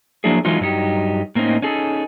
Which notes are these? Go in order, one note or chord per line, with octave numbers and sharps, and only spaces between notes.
F3 F#3 A#3 D4 E4 G#4
E3 F#3 G#3 D#4 F4
G2 F#3 D#4 G4
A2 A#3 C4 C#4 D#4
C#4 D#4 G#4 A4